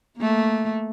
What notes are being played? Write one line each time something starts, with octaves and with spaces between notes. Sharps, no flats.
A3 A#3